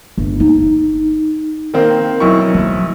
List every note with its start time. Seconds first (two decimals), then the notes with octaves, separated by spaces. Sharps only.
0.18 G1
0.40 D#4
1.74 D#3 A#3 C4
2.20 B1 E4 C#6
2.54 F3